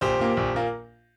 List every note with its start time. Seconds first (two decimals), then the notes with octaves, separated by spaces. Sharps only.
0.01 A#1 G4 C5
0.19 A#2 A#3
0.37 A#1
0.54 A#2 A#3